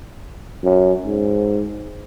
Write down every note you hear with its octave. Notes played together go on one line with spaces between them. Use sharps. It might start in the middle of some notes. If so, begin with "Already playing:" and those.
F#2
G#2